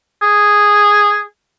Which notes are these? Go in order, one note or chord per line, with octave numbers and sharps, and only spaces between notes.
G#4